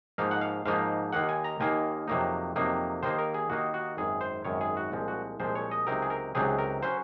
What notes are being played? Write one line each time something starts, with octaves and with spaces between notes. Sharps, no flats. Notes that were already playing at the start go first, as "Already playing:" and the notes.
G#2 F3 A#3 D#4 F5
F#5
F5
G#2 F3 A#3 D#4 F5
D#2 D#3 A#3 F#5
G#5
A#5
D#2 D#3 A#3 G#5
F2 C3 F#3 A#3 D#4
F2 C3 F#3 A#3 D#4
D#2 D#3 A#3 D#4 C5
A#4
G#4
D#2 D#3 A#3 D#4 F#4
F#4
G#1 F#2 D#3 G#4
C5
G#1 F#2 D#3 C#5
G#4
F#4
C2 A#2 F3 G#3
F#4
C2 A#2 F3 G#3 C5
C#5
D#5
C#2 C3 F#3 C4 D#4 A#4
G#4
A#4
C#2 C3 F#3 C4 D#4 G#4
A#4
F#3 C#4 C5